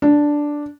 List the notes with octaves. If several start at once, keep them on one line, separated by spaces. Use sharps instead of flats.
D4